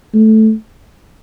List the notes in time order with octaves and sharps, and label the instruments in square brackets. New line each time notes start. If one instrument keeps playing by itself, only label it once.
[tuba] A3